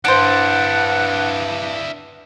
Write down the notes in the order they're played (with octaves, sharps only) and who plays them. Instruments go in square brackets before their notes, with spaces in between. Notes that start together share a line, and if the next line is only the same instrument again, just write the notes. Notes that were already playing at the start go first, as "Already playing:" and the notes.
[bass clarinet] G2 [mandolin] D4 C5 [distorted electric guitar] E4 D5 [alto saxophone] F#5